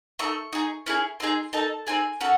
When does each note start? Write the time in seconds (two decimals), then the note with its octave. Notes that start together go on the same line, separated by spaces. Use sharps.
0.19 A3 D#4 A4 C#6
0.53 D#4 G#4
0.86 C#4 E4 G#4
1.20 C4 D#4 G#4 C6
1.53 D#4 A4 A5
1.87 C4 D#4 G#4 G#5
2.20 C#4 F#4 A4 F#5